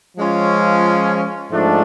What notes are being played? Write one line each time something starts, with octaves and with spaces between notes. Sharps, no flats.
F3 G#3 C#4 F4
G#2 F3 A3 D4